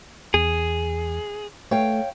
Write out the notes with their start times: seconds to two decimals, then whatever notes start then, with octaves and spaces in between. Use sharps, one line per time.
0.34 E2 G#4
1.71 A3 C#5 F5 G5